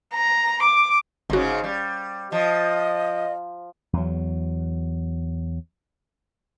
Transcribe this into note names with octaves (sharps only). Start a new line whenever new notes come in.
A#5
D6
G1 G#2 C#3 F#4
G3
F3 D#5
E2 F#3